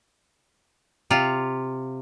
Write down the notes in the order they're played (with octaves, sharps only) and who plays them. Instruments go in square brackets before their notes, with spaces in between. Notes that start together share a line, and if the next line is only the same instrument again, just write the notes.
[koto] C3 F4